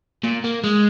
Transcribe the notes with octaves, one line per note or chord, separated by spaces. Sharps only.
A#2
A#3
G#3